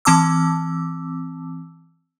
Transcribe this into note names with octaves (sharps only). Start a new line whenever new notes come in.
E3 C4 A5 D6 E6